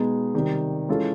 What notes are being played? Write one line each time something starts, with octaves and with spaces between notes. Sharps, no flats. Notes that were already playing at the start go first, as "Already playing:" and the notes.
Already playing: B2 G#3 B3 D#4 G#4
C3 D#3 G3
E3 G#3 C#4 F4 A4